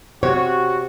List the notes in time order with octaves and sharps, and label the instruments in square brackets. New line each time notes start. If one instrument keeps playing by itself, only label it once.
[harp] C3 [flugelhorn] F#4 [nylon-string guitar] C#5